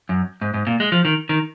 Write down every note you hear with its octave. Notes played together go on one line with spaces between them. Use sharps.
F#2
G#2
G#2
A#2
G#3
F3
D#3
D#3